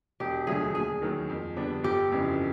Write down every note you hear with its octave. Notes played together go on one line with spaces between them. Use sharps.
E1 G4
D2 D3 F#3 A3 G#4
D#2 G#4
D#3 F#3 A#3
F2
D3 G3 B3 D4
G1 G4
F2 C#3 E3